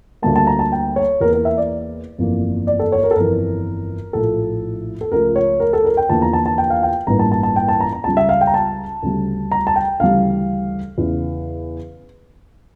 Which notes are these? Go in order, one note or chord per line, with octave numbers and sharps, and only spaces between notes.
D2 D3 G3 A#3 A5
A5
A#5
A5
G5
C#5
E2 E3 A#3 A#4
A#4
E5
D5
G1 F2 E3 A#3
D5
A4
C#5
A#4
A4
G1 F2 E3 A#4
A#1 A2 F3 A4
A4
C#2 C#3 F3 A3 A#4
C#5
A#4
A4
A#4
G5
E2 D3 F3 A#3 A5
A#5
A5
A5
G5
F5
G5
A1 G2 E3 A#3 A#5
A5
A5
A5
G5
A5
A#5
A#5
C#2 C#3 G3 A5
E5
F5
G5
A#5
A5
D2 C#3 G3
A#5
A5
G5
D2 C#3 E3 G3 F5
E2 C#3 E3